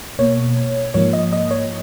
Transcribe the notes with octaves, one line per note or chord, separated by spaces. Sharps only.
B2 A#3 C#5
G#2 F3 A#3 C#5
D#5
D#5
C#5